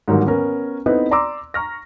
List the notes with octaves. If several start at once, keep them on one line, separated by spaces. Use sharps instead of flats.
G#2 D3 D#3 F#3 G3 A#3
B3 C#4 A#4
B3 C4 D#4 E4 A4 B4
D5 A#5 C6 D6 E6
A#5 C#6 F6 A#6